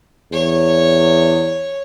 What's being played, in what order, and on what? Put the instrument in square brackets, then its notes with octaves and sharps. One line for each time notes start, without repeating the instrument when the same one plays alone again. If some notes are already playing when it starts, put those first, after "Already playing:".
[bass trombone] E2 [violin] C#5